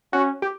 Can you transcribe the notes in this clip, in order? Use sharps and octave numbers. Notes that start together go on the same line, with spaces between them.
C#4 F#4
G4